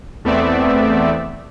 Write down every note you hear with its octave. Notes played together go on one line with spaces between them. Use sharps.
E2 A3 B3 C4 D5 E5